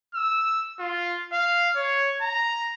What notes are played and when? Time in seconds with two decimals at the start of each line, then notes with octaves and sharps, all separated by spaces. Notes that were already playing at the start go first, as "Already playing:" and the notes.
0.15 E6
0.80 F4
1.33 F5
1.76 C#5
2.22 A#5